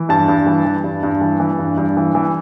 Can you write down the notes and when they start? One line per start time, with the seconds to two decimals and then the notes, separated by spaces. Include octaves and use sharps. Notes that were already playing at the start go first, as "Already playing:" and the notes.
Already playing: E3
0.09 G2 A5
0.28 G2
0.46 E3
0.65 E3
0.84 G2
1.03 G2
1.21 E3
1.40 E3
1.59 G2
1.77 G2
1.97 E3
2.15 E3